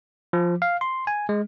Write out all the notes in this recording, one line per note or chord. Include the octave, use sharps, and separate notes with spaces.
F3
F5
C6
G#5
G#3